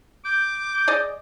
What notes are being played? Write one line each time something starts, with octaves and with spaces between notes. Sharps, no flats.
D6 G6
G#4 D5 D#5